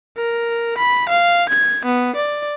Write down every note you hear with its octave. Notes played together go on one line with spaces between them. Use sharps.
A#4
B5
F5
G#6
B3
D5